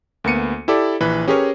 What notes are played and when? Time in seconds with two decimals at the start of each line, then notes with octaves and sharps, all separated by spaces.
0.24 D2 A#3 B3 C#7 D#7
0.68 E4 G4 A4 D5
1.00 A#1 E3 B4 B5
1.28 C#4 G4 G#4 A#4 B4 C#5